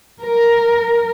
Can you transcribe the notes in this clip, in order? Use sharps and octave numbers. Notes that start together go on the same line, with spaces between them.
A#4